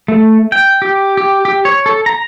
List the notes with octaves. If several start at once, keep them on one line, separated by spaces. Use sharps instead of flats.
A3
G5
G4
G4
G4
C#5
A4
A#5